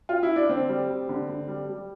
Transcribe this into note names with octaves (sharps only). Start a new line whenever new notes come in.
F4
E4
D4
D3 C4
G3
G3
D3
D3
G3
G3